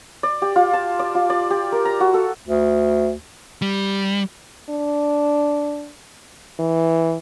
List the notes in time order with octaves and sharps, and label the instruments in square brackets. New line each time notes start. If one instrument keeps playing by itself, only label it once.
[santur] D5
G4
F4
A5
D5
F4
D5
G4
A#4
A#5
F#4
A4
[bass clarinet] D2
[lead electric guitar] G3
[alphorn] D4
E3